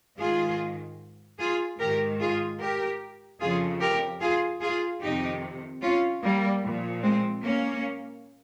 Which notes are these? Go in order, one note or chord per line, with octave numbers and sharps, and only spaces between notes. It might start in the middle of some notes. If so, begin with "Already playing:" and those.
G#2 D#3 F4 G#4
F4 G#4
G#2 D#3 G4 A#4
F4 G#4
G4 A#4
F2 C#3 F3 F4 G#4
G4 A#4
F4 G#4
F4 G#4
F2 C3 D#3 D#4 G4
C#4 F4
G3 A#3
A#2 F3
G#3 C4
A#3 C#4